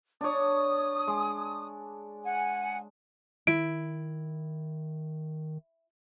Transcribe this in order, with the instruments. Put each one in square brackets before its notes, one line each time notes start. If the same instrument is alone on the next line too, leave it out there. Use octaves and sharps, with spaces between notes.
[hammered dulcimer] D4 C#5 [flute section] D#6
[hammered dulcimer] G#3
[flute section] F#5 G#5
[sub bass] D#3 [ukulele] E4 [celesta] D7